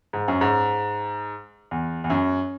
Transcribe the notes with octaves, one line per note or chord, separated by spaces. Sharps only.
G#2
F#2
G#2
E2
E2
F#2